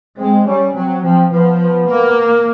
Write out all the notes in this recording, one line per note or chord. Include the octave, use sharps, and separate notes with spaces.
G#3 C4
G3 C#4
F#3 C4
F3 C4
F3 B3
B3
A#3